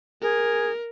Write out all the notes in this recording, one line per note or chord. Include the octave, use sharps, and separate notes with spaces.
G#4 A#4